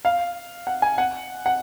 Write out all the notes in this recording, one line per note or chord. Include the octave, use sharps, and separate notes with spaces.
F5
F#5
G#5
F#5
F#5